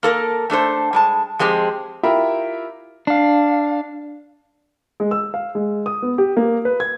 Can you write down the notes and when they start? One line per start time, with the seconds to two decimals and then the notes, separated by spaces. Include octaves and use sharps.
0.03 A#3 A4 A#4
0.50 A3 D4 A4 C5
0.93 G3 G#3 A5
1.39 F3 G#3 C4 G4
2.03 E4 F4 G4 A#4 E5 B5
3.07 D4 F5
5.00 G#3
5.11 E6
5.34 F5
5.55 G#3
5.86 D#6
6.02 B3
6.18 G4
6.37 A#3
6.65 B4
6.80 G#6